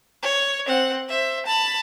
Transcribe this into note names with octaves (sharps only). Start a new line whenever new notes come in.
C#5
C4 F#5
C5 E5
A5 B5